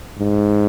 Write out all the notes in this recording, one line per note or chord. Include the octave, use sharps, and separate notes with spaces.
G#2